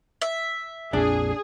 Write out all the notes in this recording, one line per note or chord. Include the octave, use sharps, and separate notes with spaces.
E5
A#1 F2 D4 G#4